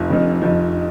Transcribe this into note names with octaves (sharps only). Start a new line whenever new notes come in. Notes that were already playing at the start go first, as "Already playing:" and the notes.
Already playing: F1 F2 F3
F1 F2 F3
F1 F2 F3